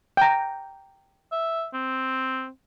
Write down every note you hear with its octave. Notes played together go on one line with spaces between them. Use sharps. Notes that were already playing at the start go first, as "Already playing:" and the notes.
G5 A#5
E5
C4